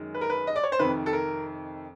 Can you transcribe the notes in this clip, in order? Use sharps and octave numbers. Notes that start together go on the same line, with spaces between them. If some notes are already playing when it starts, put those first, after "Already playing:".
Already playing: F#2 D#3 G#3
B4
A#4
B4
D#5
D5
C#5
C5
F2 C3 D#3 B4
A4
A#4